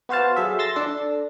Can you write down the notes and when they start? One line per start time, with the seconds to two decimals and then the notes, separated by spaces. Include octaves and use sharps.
0.09 B3 F#4 C5 F5 A5
0.36 F#3 G#4 A4 E5
0.59 C6 E6 A6 A#6
0.76 D4 A4